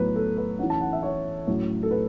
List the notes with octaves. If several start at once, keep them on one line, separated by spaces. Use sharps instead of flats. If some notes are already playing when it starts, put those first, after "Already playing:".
Already playing: A2 F#3 B3 B4
A4
B4
E3 C#4 F#5
A5
F#5
E5
C#5
A2 F#3 C#4
A4
B4